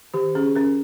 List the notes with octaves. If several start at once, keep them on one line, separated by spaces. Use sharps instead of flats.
D#3 G4
C#4 G#4
C#4 A#4